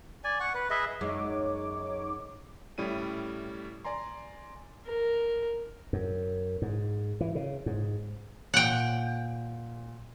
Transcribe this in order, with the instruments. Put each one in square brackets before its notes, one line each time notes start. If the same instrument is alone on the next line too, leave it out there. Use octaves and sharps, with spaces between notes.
[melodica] D5 G#5
F#5 C#6
B4
G#4 B4 D#5 E5
[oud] F#2 G#3 [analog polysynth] D#4 C#5 D6
[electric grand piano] A2 G3 C#4 E4 D#7
D5 G#5 A#5 C6
[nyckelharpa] A#4
[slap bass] F#2
G#2
E3
C#3
G#2
[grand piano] A#2 [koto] F#5 G5